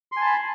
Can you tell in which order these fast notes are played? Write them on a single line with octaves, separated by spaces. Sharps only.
C6 G#5 A5 B5